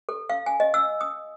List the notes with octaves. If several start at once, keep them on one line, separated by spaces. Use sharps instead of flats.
A4
F5
G#5
D#5
E6
D#6